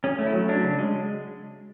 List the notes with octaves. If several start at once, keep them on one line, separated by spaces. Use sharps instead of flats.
C#4 G#4
A3
E4
F#3
C#4 D4
C#3
G#3